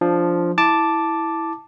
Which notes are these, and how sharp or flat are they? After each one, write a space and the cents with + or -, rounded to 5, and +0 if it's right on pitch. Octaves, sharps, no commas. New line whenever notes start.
F3 +0 D4 +0
E4 -5 A5 +0 D6 +0